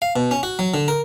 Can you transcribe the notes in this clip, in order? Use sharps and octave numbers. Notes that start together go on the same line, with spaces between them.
F5
B2
C#4
F#4
F#3
D3
A#4